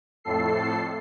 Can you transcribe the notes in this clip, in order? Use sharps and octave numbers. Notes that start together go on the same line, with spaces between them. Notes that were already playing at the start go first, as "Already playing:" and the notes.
F2 A2 A4 C7